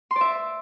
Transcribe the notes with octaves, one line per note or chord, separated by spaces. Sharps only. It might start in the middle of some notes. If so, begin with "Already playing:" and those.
C6
D5
E5